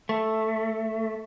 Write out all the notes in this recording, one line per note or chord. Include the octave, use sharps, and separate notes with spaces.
A3